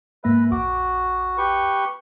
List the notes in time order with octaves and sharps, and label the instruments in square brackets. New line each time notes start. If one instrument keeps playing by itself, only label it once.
[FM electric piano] G#2 A#3 E5 [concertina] B4
[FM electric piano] A#1 E2 D6 [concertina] F#4
[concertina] G4 B4 C#6